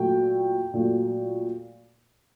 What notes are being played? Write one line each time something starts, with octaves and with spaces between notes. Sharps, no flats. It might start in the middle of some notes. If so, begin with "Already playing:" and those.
Already playing: A#2 F#3 A3 G5
A#2 F#3 A3